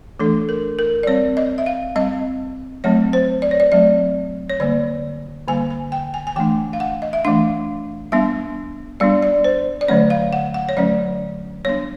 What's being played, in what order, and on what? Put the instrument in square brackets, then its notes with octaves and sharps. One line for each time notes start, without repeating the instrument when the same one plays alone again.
[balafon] E3 A3 D4 A4
A#4
A#4
D5
G3 C4 C#5
D#5
E5
F5
G3 C4 D#5
F#3 A3 C4 C#5
C5
D5
C#5
D5
F#3 A3 C4 D5
C#5
D3 G3 A#3 D5
D3 G3 A#3 G#5
G#5
G5
G#5
G#5
E3 A3 D4 G5
F5
F#5
D#5
E5
E3 A3 D4 F5
G3 B3 D4 E5
G3 B3 D4 D5
D5
C5
D5
D3 F#3 A3 C#4 C#5
F5
F#5
F#5
C#5
D3 F#3 A3 C#4 D5
G3 B3 D4 C#5